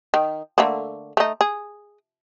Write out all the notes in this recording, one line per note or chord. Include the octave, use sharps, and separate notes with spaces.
D#3
D3 A3 A#3
A3 D#4
G#4